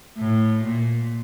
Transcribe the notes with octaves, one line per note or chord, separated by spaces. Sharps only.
A2
A#2